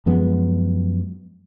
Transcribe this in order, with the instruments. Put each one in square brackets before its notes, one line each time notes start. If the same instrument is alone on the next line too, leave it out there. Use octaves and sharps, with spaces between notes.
[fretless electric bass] F#2 F3 G#3 B3